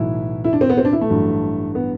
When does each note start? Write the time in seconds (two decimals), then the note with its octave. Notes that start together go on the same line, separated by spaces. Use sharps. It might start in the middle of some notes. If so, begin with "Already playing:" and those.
Already playing: B1 A2 E3 E4
0.44 E4
0.53 D4
0.61 C4
0.69 B3
0.78 C4
0.85 D4
0.93 E4
1.01 A3
1.10 A1 G2 F#3
1.75 B3